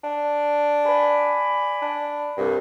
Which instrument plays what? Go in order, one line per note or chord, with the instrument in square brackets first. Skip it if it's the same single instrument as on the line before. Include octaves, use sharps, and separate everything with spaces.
[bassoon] D4
[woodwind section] D5 G#5 B5
[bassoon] D4
[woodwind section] C2 [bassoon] G2